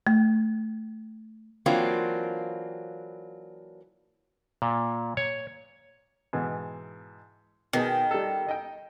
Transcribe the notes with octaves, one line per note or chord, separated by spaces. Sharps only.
A3
E3 F#3 A#3 C4 D4 F4
A#2
C#5
G#2 B2 E3
B2 D#3 B3 G#4
G3 A4
D#4 D#5 G5